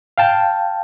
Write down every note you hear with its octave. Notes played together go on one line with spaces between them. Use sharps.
F5 G5 A5